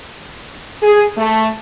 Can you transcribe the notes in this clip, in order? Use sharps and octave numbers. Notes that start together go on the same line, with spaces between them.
G#4
A3